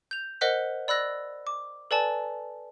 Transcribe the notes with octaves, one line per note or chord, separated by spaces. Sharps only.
G6 F7
A#4 C5 D#5 F#5 F#6 B6
D5 B5 E6 F#6 A#6
D6
A4 B4 D5 G#5 A5